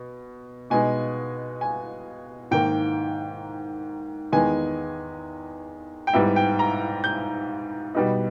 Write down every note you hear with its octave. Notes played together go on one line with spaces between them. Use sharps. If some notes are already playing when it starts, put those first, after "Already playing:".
Already playing: B2
B2 G#3 B3 D#4 G#5
G#5
G#2 D#3 A#3 G5
E2 D#3 G#3 B3 G#5
G5
G#2 G3 B3 E4 E5
G5
A#5
G6
B2 G3 B3 D#4